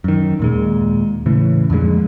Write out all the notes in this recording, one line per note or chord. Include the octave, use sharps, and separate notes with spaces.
F#2 D#3
D#2 A#2 G#3
A2 C#3 E3
F2 A#2 D3 G#3